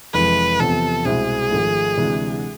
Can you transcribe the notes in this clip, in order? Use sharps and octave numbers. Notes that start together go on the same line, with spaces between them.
F1 F2 E3 G#3 B4
E2 C3 F3 B3 A4
C2 B2 G#3 C4 E4 G#4
G#1 G#2 F3 A3
D2 C3 E3 G#3 D4